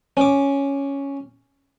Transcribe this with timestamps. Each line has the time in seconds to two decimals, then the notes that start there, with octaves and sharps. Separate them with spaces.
0.17 C#4 D6